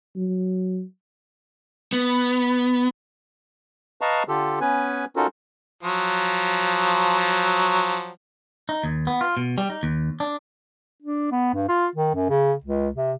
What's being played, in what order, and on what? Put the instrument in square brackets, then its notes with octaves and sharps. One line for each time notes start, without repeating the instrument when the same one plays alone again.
[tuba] F#3
[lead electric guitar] B3
[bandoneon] B4 D#5 F5 A5 A#5 C#6
D3 F4 G4 A4
B3 C#4 B4 G#5
C#4 D#4 F4 F#4 A4 A#4
[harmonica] F3 F#3
[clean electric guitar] D#4
D#2
B3
F4
B2
G3
D#4
D#2
D4
[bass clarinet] D4
B3
G2
F4
D#3
F#2
C#3
C#2
C3